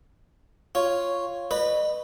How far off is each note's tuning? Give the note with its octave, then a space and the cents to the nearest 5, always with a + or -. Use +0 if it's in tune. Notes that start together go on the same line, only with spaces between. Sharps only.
F4 +0 C#5 +0
B4 +0 D#5 -35 B5 -15